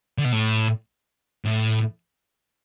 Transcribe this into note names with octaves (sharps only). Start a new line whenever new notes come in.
D3
B2
A2
A2